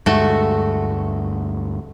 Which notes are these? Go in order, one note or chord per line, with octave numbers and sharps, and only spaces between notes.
D2 G2 G#3 A3 F#4